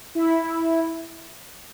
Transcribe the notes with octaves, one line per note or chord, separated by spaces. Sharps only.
E4